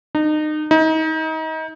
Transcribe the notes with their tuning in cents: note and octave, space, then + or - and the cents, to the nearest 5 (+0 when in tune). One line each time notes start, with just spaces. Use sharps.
D#4 -30
D#4 +30